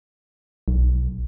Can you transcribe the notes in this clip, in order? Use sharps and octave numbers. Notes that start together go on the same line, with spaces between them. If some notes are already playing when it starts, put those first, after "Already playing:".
B1